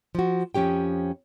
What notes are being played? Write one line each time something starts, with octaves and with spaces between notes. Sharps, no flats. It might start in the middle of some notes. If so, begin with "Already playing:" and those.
F3 F#4
F2 F3 C#4 G4 G5